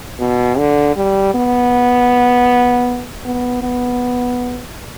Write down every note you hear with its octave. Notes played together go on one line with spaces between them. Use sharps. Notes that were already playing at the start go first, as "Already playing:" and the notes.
B2
D3
G3
B3
B3
B3